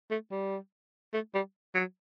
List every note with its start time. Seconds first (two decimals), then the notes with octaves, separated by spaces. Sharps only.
0.11 A3
0.31 G3
1.13 A3
1.34 G3
1.74 F#3